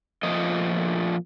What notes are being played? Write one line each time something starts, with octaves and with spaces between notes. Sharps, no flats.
A#2 F3 A3 D#5